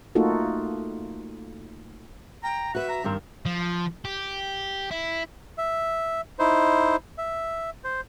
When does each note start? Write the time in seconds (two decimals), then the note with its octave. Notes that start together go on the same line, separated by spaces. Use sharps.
0.15 A3 A#3 D#4 F4 F#4 A4
2.43 G5 A#5
2.75 F#4 B4 E5 F#5
2.89 A#5
3.04 G2 D#3 C4 A#4
3.46 F3
4.05 G4
4.91 E4
5.58 E5
6.39 D#4 E4 C5
7.18 E5
7.84 C5